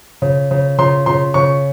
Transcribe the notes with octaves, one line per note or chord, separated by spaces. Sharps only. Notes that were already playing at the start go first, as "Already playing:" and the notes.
C#3
C#3
C#3 C6
C#3 C6
C#3 C#6